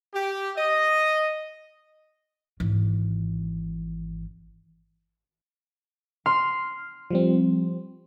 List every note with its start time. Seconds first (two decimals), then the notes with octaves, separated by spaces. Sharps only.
0.14 G4
0.57 D#5
2.60 G#1 E3
6.26 C6 F6
7.11 F3 G3 C4